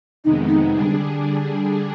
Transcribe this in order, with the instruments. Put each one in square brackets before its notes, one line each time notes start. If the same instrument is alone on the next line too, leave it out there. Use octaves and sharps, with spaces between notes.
[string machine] F2 C3 D#3 G#3 B3 [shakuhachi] D#4
[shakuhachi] D#4
[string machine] D3 G3 D4 G#4